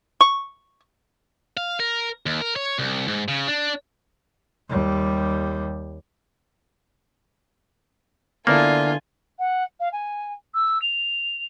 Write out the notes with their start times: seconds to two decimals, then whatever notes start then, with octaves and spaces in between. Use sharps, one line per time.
0.21 C#6
1.57 F5
1.80 A#4
2.26 D#2
2.41 A#4
2.56 C#5
2.79 C2
3.08 G#2
3.28 C#3
3.48 D4
4.69 D#2 G3
8.47 D3 A#3 B3 D4 E4 F4 G#5
9.39 F#5
9.80 F5
9.92 G#5
10.54 E6
10.82 F7